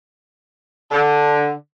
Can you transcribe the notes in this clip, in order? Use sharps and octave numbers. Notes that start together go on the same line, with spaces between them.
D3